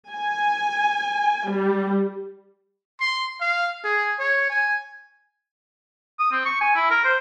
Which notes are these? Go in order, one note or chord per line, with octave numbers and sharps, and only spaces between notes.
G#5
G3
C6
F5
G#4
C#5
G#5
D#6
C4
C#6
G#5
E4
A#4
C5